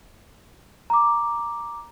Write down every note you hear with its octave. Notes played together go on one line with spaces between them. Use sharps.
A#5 D6